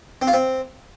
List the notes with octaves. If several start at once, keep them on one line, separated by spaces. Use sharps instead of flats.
C4
F4
C4